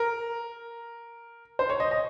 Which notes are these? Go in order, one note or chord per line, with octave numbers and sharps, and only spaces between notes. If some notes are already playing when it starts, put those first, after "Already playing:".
Already playing: A#4
C5
C#5
D#5
D#5